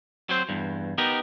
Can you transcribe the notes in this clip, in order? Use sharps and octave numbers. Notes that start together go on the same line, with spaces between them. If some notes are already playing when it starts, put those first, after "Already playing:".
F#3 C4 C5
E2 G2
B3 D#4 G4 A#4